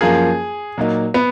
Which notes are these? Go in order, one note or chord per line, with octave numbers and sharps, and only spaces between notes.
F#2 F3 A#3 F4 G#4 A#4
A#2 F#3 A#3 D#4
B3